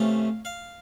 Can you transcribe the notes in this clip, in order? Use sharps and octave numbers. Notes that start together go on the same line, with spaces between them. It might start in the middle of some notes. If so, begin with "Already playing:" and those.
Already playing: C3 E3 A3 C#4 F5
F5